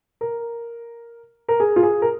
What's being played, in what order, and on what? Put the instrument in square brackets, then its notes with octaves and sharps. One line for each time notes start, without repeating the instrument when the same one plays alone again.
[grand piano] A#4
A#4
G#4
F4
G#4
A#4